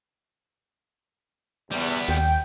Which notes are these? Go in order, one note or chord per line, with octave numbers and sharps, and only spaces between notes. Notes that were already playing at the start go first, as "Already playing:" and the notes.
E2 G3 B3
D#2 G5